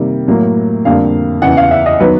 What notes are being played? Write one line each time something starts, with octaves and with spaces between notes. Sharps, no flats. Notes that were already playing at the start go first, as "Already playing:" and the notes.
Already playing: C3 D#3 G3 A#3
A2 F#3 A#3
F2 D3 G3 A#3 F5
E2 C#3 E3 F#5
F5
E5
D#5
D#3 F#3 B3 B4